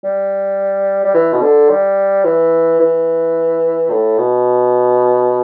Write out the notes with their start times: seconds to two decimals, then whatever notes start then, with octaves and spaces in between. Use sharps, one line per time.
0.04 G3
1.05 G3
1.14 E3
1.33 B2
1.42 D3
1.69 G3
2.25 E3
2.80 E3
3.91 A2
4.18 B2